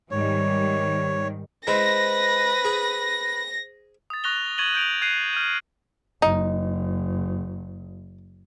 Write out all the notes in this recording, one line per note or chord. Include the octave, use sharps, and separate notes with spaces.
G#2 D#3 G3 C#5
G#3 E4 B4 C5 A#6
G#4
D#6 A6
C#6 F#6 A#6 F7 G7
C#6 G#6 A6 D#7 F#7 G7
G6 D7 F7
F#6 G#6 C7 D#7
F6 G6 D#7
F#1 D#4